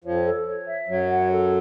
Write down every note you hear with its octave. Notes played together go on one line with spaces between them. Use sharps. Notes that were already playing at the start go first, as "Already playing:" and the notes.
F2 F3 C#5
A4
C#5
E5
F#2 F#3 C#5
F#5
A4